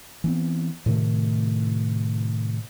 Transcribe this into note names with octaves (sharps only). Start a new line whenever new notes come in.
E3 B3 C4
A2 C3 D#3 A3